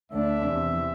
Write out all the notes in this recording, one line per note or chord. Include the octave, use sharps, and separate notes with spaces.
D2 D3 A3 D4 E5
E2 C3 E3